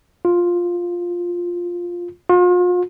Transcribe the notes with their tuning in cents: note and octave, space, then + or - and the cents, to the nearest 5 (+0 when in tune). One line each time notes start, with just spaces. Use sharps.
F4 +5
F4 +40